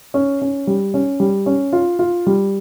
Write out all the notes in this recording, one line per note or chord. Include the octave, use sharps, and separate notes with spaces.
C#4
C#4
G3
C#4
G3
C#4
F4
F4
G3